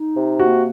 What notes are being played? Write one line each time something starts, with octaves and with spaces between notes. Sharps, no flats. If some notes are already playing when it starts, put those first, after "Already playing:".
Already playing: D#4
C3
A#3 F#4